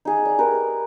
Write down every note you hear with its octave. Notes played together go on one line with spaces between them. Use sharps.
D#4 G#4
D5
G4 A#4 B4